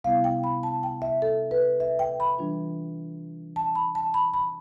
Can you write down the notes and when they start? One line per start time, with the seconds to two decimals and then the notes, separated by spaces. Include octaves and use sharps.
0.04 C3 G3 B3 E4 F5
0.24 G5
0.44 B5
0.63 A5
0.83 G5
1.02 E5
1.22 A4
1.51 B4
1.80 E5
1.99 G5
2.20 B5
2.38 E3 G3 D4 F4
3.56 A5
3.75 B5
3.95 A5
4.14 B5
4.34 B5